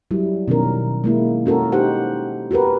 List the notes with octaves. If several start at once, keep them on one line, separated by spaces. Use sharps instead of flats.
F#3 G3 E4
B2 D#3 C#4 A#4
G#3 A#3 E4
C#4 F#4 A4 A#4
D#4 G4 C5 F#5
F#4 G4 A#4 B4